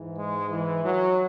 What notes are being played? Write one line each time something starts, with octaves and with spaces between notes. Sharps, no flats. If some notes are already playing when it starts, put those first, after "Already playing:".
Already playing: G#2 E3
G#3
E3
F#3